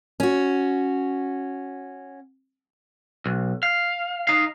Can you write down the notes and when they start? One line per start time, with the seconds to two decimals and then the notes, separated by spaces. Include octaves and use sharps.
0.20 C#4 F#4
3.26 B1
3.63 F5
4.27 D#4 F5